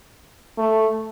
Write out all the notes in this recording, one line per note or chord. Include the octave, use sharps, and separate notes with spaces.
A3